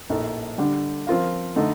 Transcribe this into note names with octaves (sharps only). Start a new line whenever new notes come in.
A#1 A2 A3 D#4
D3 G3 D4 G4
F3 C4 F4 A#4 F5
D3 A3 D#4